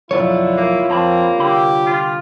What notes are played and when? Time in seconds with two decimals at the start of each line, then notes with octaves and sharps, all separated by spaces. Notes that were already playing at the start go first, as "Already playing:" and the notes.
0.11 B1 F2 D3 F#3 E4 F4 C#5
0.57 A#3
0.89 F2 A#3 C4 A5 B5
1.38 C2 D3 G4 B5
1.86 F4